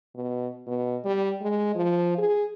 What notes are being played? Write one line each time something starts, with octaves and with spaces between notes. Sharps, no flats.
B2
B2
G3
G#3
F3
G#4